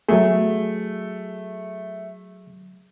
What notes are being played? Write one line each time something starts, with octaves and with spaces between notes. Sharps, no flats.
F#3 A3 G#4